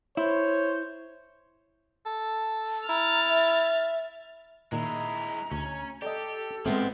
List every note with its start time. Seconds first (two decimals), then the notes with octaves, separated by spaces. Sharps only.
0.17 E4 C5 C#5
2.06 A4
2.89 E4 A#5 F6 A6
3.29 E5
4.72 A#2 D#3 G#3 E4 A#5
5.52 D2 C#4
6.02 G4 A4 D5 D#5
6.66 A#2 F3 G#3 A3 B3 C4